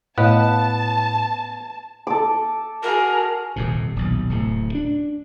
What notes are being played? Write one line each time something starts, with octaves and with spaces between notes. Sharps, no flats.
A2 A3 B3 D#5 A5
A4 D6
F#4 G#4 A#4
D#1 F2 C3
D#1 B1
D1 A2 C3
D4